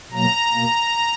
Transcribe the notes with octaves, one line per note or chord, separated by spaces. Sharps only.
B2 F#3 A#3 A#5
B2 A#3